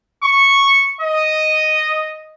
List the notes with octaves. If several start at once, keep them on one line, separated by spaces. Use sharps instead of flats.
C#6
D#5